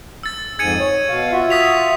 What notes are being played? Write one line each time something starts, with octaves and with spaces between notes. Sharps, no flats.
E6 A6
F2 G#2 G#4 G#6 C#7 D#7
C#5
B2 F5
F4 F#4 E5
D#6 B6 F7